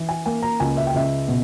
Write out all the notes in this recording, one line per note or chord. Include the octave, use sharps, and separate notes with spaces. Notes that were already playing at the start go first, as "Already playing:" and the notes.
Already playing: E3
G#5
A#3 G#5
A#5
C#2 G#5
E5
G5
C#2 E5
B2